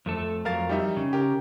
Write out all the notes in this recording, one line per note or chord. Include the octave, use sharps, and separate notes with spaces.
F2 A3 A4
F2 F#3 A#4 F5 A6
G3 D#4 E5
C#3
G4 A#4